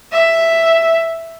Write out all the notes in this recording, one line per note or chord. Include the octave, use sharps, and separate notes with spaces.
E5